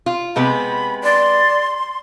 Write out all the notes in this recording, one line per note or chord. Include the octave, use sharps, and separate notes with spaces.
F4
C3 G#3 B3 B5
D5 C6